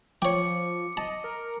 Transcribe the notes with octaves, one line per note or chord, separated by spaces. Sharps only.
F3 C#5 G5 D6 C#7
D#5 A5
A#4